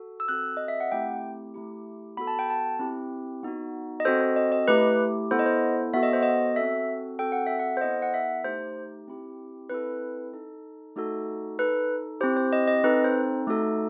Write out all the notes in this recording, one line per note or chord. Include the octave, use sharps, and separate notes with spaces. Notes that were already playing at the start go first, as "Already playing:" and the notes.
Already playing: F#4 A4
E6
C4 F#4 A4 F#6
D#5
E5
F#5
A3 C4 E4 G4 G5
A3 E4 G4
B3 F#4 A4 B5
A5
G5
A5
C4 E4 G4
B3 D#4 F#4
D#5
C4 F#4 A4 C5
C5
D#5
D#5
A3 E4 G4 B4
B3 E4 A4 C5
D#5
C5
B3 F#4 A4 E5
D#5
C5
D#5
C4 F#4 A4 E5
C4 F#4 A4 G5
F#5
E5
F#5
C5
B3 E4 A4 D#5
F#5
E5
A3 D#4 G4 C5
C4 E4 G4
C4 E4 A4 B4
D#4 A4
A3 D#4 F#4 A4
D#4 A4 B4
C4 E4 G4 C5
C5
D#5
D#5
C4 D#4 A4 B4
C5
A3 D#4 F#4 A4